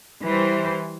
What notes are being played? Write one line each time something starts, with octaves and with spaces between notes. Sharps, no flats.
E3 G3 C5